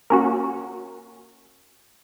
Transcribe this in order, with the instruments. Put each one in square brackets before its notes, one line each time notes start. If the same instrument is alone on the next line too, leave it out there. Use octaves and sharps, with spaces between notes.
[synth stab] A#3 C#4 F#4